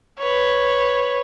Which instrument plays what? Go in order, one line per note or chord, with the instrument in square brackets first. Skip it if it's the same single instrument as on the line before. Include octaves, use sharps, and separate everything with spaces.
[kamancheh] B4 C#5